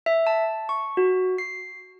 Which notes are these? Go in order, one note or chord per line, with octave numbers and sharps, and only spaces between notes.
E5
A5
C#6
F#4
C7